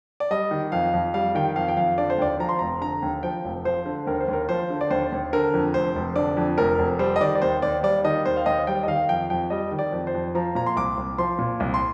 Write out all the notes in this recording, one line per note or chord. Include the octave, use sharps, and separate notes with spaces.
D5
G3 D#5
D#3
F2 F5
F2
G3 F5
D#3 G5
F2 F5
G5
F2 F5
D3 D5
C5
D#2 D5
F3 A#5
C6
F1 A#5
D3 A#5
D#2
F3 G5
F1
F3 C5
D3
D#2 A#4
C5
D#2
A#4
F3 C5
D3
D5
D#2 C5
D#2
D3 A#4
F2
F1 C5
F1
D3 D5
F2
F1 A#4
F1
G3 C5
D#5
D#3 D5
D5
D#2 C5
D#2 D5
G3 D5
D#3 D#5
D#2 C5
F5
D#2 D#5
G3 G5
D#5
D#3 F5
F2 G5
F2 G5
G3 D#5
D#3
D5
F2
C5
F2
F3 A#5
A#2 A#5
C6
C2 D6
C2
F3 C6
A#2
C2
C6